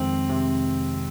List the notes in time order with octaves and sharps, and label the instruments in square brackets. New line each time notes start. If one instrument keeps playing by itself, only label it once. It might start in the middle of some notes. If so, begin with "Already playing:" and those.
Already playing: [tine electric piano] F2 D#3 G#3 [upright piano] C4
[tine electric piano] C3